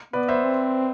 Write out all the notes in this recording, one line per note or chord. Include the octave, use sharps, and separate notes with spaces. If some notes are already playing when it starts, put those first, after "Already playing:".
B3 B4 D5
C5 E5
C4